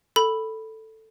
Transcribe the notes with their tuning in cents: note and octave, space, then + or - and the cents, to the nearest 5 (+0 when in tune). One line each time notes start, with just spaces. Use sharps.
A4 +10 B5 +0